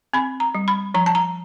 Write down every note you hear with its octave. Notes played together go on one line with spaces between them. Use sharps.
C4 B5
A#5
G3
B5
F3 A#5
A5
A#5